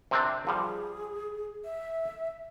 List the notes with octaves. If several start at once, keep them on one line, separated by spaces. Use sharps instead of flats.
C3 C4 D4
F3 G3 G#4
E5